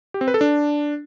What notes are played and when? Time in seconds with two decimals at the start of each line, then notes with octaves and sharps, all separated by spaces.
0.14 G4
0.21 C4
0.28 B4
0.34 A4
0.41 D4